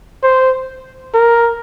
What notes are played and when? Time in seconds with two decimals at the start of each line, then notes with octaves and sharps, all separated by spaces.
0.23 C5
1.14 A#4